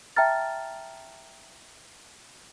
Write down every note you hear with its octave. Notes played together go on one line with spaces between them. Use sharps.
E5 G5 A5 A#5 F6 A6